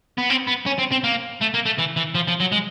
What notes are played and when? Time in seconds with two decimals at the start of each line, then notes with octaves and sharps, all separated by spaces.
0.18 B3
0.30 C4
0.47 B3
0.66 C#4
0.79 C4
0.92 C4
1.04 A#3
1.41 A3
1.54 A#3
1.65 A3
1.78 E3
1.96 E3
2.15 F3
2.27 F3
2.40 F#3
2.52 G#3